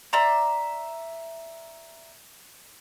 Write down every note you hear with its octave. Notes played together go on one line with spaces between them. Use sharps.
D5 E5 A#5 C6